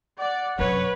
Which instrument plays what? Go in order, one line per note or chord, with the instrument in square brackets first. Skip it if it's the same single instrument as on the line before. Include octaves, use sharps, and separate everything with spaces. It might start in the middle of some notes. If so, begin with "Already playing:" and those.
[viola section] D5 [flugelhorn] F#5
[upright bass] F#2 C3 [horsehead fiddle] B4 [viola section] C#5